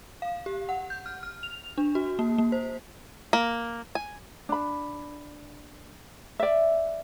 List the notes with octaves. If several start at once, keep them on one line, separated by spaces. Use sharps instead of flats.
F5
G4
F#5
G6
F6
F6
F7
D4
F#4
A#3
A#3
C5
A#3
G#5
D4 B5
D5 E5